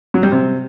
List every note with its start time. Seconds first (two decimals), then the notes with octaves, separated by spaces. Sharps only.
0.14 F#3
0.23 G3
0.32 C3